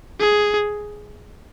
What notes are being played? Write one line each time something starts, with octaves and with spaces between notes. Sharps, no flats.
G#4